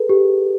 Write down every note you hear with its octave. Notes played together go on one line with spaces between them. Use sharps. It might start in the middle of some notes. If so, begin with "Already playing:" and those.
Already playing: G#4 A4 B4
G4